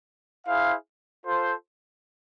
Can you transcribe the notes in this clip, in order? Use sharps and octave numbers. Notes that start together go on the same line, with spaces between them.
E4 G#4 C5 F5
F4 A4 C5